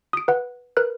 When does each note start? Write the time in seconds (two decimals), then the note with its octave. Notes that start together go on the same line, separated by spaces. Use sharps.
0.13 D#6 D7
0.28 B4 F#5
0.77 A#4 B4 F#6